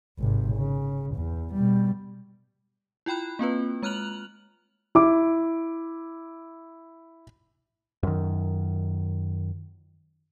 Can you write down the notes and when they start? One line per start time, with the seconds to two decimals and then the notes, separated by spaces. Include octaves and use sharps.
0.19 G#1 C3
0.56 C#3
1.15 E2
1.53 B2 G3
3.06 E4 F4 G5 B5 F#6
3.39 A#3 C4 F4 B4
3.82 G#3 A#5 F6 F#6 F7 F#7
4.95 E4 D6
8.03 F#2 D#3